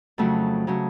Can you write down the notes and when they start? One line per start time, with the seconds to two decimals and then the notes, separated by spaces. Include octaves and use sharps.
0.18 F2 C#3 F#3 A3
0.67 C#3 F#3 A3